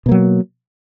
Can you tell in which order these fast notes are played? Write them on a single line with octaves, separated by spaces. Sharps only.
B2 A#3 F#3